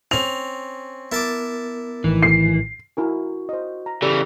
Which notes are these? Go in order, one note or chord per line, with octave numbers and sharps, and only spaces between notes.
C4 C#4 F7
B3 E4 A#4 A5 D6 A6
A#1 A2 D#3 E3
C7
E4 F#4 A#4 G#5
C5 D#5
A#5
C#3 E3 G4 A4 D5